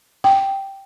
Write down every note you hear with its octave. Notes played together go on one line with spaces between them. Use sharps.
G5